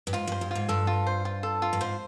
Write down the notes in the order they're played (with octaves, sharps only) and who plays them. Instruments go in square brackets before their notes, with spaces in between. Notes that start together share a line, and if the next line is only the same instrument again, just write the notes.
[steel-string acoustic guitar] G2
[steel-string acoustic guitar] G#2 [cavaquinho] F4
[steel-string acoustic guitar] G2 [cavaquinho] C5
[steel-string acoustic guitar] G2
[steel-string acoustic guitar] G#2 [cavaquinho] F4
[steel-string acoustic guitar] G2 [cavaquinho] A4
[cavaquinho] F4
C5
F4
A4
F4
[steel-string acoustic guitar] G2
[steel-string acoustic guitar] G#2 [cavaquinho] C5